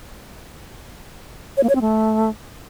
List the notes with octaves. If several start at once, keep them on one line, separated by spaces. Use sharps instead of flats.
C#5
A#3
C#5
C4
A3